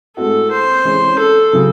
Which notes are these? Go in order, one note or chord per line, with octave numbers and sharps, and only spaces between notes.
A2 G#3 C4 F#4 A4
C5
E3 G#3 C#4 G#4 C#5
A4
C#3 F#3 C4